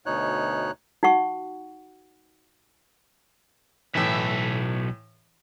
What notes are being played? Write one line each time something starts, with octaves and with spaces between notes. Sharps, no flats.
D2 B2 D#4 C#5 F#6
D#4 F#4 F#5 C#6
B1 A2 E3 E5